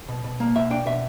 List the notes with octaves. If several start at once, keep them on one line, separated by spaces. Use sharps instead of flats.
B2
B2
A#3
B2 E5
D4 G5
B2 E5